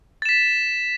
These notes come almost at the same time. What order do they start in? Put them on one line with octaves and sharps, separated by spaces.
A6 E7 B6